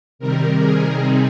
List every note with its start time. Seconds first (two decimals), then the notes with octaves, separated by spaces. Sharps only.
0.19 C3 D#3 G3 A#4
0.57 G#4
0.96 C3 G3 C4 D#4